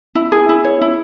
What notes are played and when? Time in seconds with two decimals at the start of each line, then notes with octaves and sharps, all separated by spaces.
0.15 E4
0.32 G#4
0.49 E4
0.64 C#5
0.81 E4